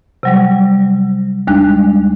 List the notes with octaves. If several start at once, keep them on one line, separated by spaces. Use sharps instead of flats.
C3 F#3 G3
D#2 G3 G#3 D4 F#6